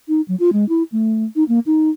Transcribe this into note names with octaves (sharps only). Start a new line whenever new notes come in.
D#4
F#3
F4
G#3
E4
A3
D#4
A#3
D#4